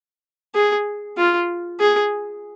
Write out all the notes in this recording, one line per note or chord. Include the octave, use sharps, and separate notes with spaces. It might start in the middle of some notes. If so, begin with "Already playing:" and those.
G#4
F4
G#4